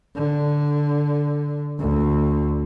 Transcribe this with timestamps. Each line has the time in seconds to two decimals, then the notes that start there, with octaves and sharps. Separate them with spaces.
0.15 D3
1.79 D2